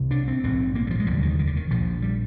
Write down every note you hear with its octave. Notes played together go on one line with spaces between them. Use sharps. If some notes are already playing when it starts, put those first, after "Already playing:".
Already playing: C2 C3
D4
C4
A#1 G#2 C4
A#3
G3
F3
G#3
F1 D#2 D3 G3
D#3
D#3
D3
D#3
A#1 A#2 F3
G3